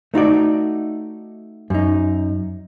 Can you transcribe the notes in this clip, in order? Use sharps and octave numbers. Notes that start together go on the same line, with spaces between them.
A3 D#4 F#4 D5
F#2 D#4